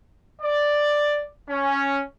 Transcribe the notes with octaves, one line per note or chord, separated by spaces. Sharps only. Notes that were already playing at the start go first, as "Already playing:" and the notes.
D5
C#4